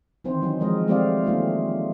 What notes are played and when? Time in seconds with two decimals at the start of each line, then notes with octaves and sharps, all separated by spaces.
0.24 D#3 E3 C4 C5
0.42 F#3 C#4 D#4
0.60 F3 G#3 A#4 D#5
0.87 G#3 A3 C4 G4 D5 F5
1.24 D#3 A3 A#3 C#4 D#4 F4